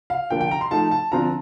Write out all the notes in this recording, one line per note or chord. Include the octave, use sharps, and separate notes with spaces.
F5
D3 F3 A#3 G5
G5
A#5
C6
F3 A3 D#4 A5
A5
D3 F3 C4 F4 A#5